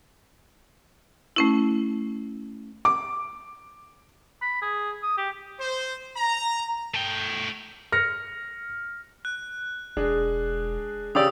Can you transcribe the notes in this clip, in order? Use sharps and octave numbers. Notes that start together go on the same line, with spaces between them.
A3 C#4 E4
D6
B5
G#4
D#6
G4
C5
A#5
A3 G5
F6 A#6 C#7
F#6
E1 G#3 D4 G#4
C#3 G4 D5 D#6 E6